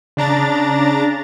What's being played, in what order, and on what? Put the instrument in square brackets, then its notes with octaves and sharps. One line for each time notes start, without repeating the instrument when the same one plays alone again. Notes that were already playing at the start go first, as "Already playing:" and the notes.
[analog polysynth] C#3 D4 A#5 A6